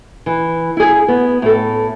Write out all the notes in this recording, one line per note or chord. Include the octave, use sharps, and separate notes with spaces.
E3
E4 G#4
B3
A2 A4